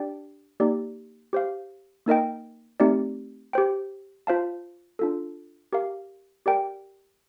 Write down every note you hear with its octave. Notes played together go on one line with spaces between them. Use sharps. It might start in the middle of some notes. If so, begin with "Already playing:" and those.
Already playing: D4 G4 D5 G5
A#3 D#4 G4 D5
G4 C5 F5
A#3 D#4 A#4 D#5 G5
A3 C4 D#4 G4 D5
G4 C5 G5
F4 C5 F5 A5
D4 F4 A4
G4 A#4 F5
G4 A#4 D5 G5